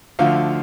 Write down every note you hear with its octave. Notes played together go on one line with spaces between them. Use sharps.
D2 D3 F3 F5